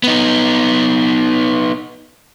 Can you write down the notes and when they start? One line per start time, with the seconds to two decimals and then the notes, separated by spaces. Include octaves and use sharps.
0.04 B3 D#4